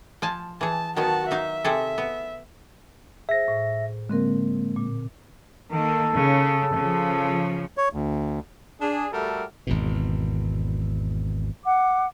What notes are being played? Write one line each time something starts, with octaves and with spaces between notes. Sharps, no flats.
F3 G#5 A5
E3 G#4 A5
D#3 F#3 B3 F#4 A5
F#3 D#4 E5 F5
C3 G#4 A4
B3
G#4 C5 E5 A#6
A2
D3 G#3 A#3 C4 A#4
A#2
D#3 A#3 A4
C#3
C#3 F3
C#5
D2
D4 G#4
G3 A3 F#4 G4 A4 A#4
G#1 E2 B2
F#5 D6